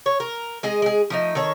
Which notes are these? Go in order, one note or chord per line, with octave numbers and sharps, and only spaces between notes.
C#5
A#4
G#3 G#4 D#5
G#3 G#4
F3 A3 D#4
D#3 A4 C#5